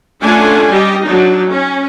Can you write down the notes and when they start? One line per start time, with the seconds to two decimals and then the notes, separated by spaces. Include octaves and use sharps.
0.22 A3 C#4 D4 F4 F#5 G#5
0.72 G3 G4 D#5
1.06 F#3 D4 D#4
1.50 C#4